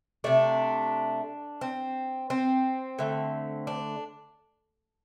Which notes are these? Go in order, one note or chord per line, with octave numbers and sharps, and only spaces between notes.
C3 A3 D4
C4
C4
D3 A3
D4